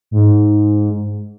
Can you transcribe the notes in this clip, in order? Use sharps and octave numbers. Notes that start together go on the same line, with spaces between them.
G#2